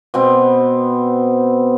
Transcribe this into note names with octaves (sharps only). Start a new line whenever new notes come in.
B2 B3 C4